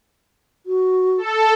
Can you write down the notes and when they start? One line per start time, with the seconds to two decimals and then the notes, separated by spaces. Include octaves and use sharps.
0.66 F#4
1.18 A4